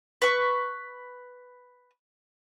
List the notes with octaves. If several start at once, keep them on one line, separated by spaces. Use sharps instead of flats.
B4 C#6